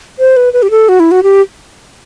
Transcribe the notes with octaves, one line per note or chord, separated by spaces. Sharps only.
C5
B4
B4
G4
A4
F#4
E4
F#4
G4